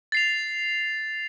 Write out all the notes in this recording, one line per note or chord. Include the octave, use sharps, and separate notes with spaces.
A6 C7 F7